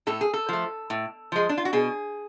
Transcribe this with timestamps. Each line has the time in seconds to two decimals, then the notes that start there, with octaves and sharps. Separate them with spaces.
0.07 A2 A4
0.21 G#4
0.34 A4
0.49 F3 A3
0.90 A2
1.32 F3 G#3
1.49 D4
1.57 F4
1.65 F#4
1.73 B2 G#4